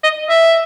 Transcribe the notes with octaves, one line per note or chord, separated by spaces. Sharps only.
D#5
E5